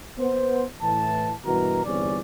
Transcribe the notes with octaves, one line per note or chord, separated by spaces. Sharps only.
B3 C5
A2 E3 A5
G2 B2 E3 F#4 A#4 A#5
G1 E2 G3 C4 C#4 D5